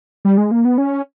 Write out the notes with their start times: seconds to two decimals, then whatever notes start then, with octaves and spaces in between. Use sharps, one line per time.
0.25 G3
0.37 G#3
0.51 A#3
0.65 B3
0.78 C#4